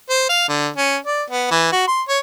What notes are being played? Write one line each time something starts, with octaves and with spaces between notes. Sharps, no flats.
C5
F5
D3
C#4
D5
B3
E3
F#4
C6
C#5